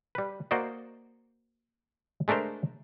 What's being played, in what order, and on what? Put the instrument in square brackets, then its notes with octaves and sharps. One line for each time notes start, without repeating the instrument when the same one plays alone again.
[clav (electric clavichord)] G3 B4
A#3 F#4 C5 D5 D#5
G#3 A3 D4 A#4 C5